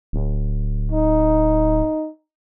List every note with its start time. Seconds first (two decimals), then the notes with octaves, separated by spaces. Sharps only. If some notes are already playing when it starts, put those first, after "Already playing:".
0.13 D1
0.92 D#4